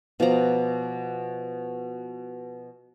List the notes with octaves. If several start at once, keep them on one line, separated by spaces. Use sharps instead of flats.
B2 F3 D5 A#5